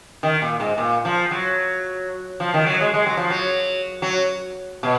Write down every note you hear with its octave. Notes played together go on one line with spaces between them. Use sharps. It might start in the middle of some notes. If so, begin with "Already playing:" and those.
D#3
A#2
G#2
A#2
F3
F#3
F3
D#3
F#3
G#3
G#3
F#3
F3
F#3
F#3
B2